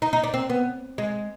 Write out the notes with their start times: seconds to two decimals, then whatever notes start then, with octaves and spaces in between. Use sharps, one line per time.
0.02 D#4
0.13 D#4
0.24 D4
0.34 C4
0.50 B3
0.98 G#3